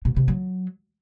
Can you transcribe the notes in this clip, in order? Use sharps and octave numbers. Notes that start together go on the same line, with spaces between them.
B2
C3
F#3